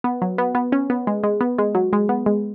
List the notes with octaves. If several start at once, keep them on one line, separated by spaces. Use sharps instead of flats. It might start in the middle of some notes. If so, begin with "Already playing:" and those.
B3
F#3
B3
B3
C#4
B3
G#3
G#3
B3
G#3
F#3
G#3
B3
G#3